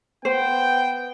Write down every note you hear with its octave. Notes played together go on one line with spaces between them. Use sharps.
B3 C5 G5